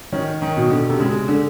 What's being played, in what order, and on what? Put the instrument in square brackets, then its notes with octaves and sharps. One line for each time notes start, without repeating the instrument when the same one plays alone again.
[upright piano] D#3 [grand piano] C#4
[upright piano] D#3
[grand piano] B2
[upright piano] D3
C3
[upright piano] C#3 [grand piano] G#3
[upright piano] D3